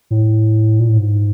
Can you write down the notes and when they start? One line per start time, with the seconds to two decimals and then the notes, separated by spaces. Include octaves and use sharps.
0.10 A2
0.80 A#2
0.89 A2
0.97 G#2